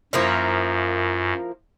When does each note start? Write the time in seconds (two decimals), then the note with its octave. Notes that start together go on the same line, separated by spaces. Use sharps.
0.13 F#2 F3 A#3 E4